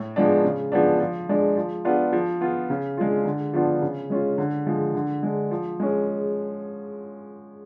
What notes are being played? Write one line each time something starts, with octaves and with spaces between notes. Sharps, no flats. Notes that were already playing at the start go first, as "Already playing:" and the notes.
Already playing: A2
F3 G#3 B3 D4
C#3
F3 G#3 B3 D4
F3
G#3 D4
F3
B3 D4 F4
F3
B3 F4
C#3
G#3 D4 F4
D3
F3 B3 D4 F4
C#3
G#3 C#4 F4
D3
F3 G#3
D3
G#3 D4
F3
G#3 C#4